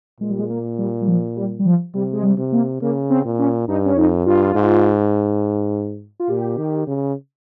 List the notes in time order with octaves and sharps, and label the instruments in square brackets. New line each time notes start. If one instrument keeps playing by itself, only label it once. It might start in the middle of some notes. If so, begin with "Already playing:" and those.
[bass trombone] A#2 [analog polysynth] G#3
[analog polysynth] G3
G#3
A#3
G3
G3
F3
G3
G3
F3
[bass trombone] C3 [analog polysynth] G3
[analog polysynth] G#3
G3
[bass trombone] C3
[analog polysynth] A#3
[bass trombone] C#3 [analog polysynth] A#3
[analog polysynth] C4
[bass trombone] A#2
[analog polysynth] C#4
[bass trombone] G2 [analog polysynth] D#4
[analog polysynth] C#4
[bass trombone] F2 [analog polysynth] D#4
[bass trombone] G2 [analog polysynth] F4
[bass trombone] G#2
[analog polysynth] F4
[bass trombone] A#2 [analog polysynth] G4
[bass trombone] D#3
C#3